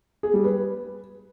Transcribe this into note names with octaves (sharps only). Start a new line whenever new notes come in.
G#4
G3
B4